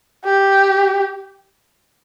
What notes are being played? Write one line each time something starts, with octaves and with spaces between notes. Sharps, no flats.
G4